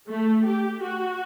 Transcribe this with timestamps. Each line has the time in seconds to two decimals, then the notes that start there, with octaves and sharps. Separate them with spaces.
0.09 A3
0.47 G4
0.84 F#4